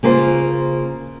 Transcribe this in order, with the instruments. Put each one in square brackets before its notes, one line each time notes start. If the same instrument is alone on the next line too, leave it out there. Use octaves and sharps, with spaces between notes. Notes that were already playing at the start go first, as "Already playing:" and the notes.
[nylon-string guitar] C#3 A#3 F4 C5